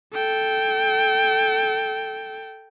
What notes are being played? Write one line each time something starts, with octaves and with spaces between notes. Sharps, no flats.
A4 G5